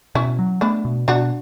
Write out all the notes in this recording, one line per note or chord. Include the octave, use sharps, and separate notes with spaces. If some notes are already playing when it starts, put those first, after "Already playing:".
B2 C#4 E4
F#3
A3 B3 D4
B2
B2 D4 F#4